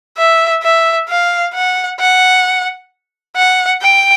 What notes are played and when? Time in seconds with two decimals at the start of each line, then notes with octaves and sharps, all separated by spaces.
0.18 E5
0.63 E5
1.09 F5
1.54 F#5
2.00 F#5
3.36 F#5
3.82 G5